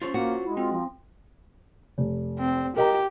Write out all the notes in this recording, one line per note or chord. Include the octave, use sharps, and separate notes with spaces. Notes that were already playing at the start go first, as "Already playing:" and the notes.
C#4 F4 C5 C#5
A#3 F#4
G#3 E4
C4 F4
F3
F1
C4
G4 A#4 D#5 A#5